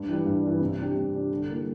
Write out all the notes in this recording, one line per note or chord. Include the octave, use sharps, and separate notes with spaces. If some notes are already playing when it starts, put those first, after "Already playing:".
Already playing: G2
E3 G3
G2
E3 G3
C3
G3 D4 G4
C3
G3 D4 G4
D3
G3 A#3 E4